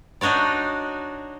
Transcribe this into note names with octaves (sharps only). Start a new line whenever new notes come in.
D4 D#4 F#4 C#5 D5